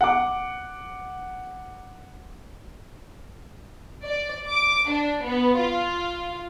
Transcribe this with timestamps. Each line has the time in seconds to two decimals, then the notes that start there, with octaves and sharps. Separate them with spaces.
0.01 F#5 D6
4.03 D5
4.47 D6
4.89 D4
5.24 B3
5.57 F4